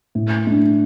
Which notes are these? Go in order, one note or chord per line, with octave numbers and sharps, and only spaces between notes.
A2
A3 D4